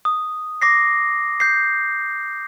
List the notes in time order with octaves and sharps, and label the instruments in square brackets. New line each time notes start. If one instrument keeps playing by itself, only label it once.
[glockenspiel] D#6
D6 A#6 C7
G6 C7